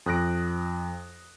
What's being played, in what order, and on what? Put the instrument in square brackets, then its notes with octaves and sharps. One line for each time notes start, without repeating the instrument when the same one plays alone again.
[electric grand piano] F2 D#6 F#6 A#6 D7